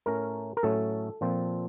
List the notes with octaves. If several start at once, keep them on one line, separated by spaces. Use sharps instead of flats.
A2 A3 C#4 A#4
A#4
A2 F#3 A3 C#4 A4
A#2 F3 C4